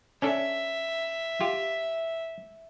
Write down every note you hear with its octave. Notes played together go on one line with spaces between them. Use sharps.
C#4 D4 A4 E5
F4 G4